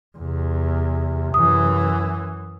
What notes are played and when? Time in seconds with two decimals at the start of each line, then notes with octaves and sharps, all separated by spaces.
0.18 E2 C3
1.34 F#2 E3 D#6